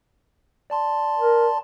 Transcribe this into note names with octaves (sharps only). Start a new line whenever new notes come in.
D5 A5 C6
A#4